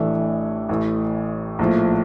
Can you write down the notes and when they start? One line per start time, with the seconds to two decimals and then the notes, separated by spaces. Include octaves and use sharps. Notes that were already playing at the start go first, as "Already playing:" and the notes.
Already playing: A1 A2 E3 A3 D4
0.69 A1 A2 E3
1.59 A#1 A2 F3